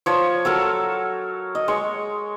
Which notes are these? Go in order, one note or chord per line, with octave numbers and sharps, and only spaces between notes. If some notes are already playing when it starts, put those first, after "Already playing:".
F3 C#5
F#3 A4 A#4
D#5
G#3 C#5